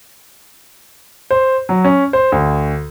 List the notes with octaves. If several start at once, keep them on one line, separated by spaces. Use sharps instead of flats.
C5
F#3
C#4
C5
D2